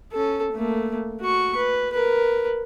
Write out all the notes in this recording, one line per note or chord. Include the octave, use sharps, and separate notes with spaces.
C#4 A4
A3 A#3
F#4 C#6
B4
A#4 B4